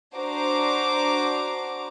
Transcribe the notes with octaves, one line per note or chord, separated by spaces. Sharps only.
D4 F#4 C5 A#5 D6